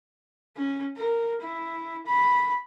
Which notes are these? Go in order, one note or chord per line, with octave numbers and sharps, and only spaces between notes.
C#4
A#4
E4
B5